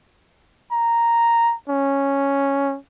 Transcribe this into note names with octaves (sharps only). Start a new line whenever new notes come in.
A#5
C#4